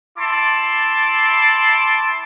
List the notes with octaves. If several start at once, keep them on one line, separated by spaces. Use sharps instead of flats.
E4 A5 C6 D6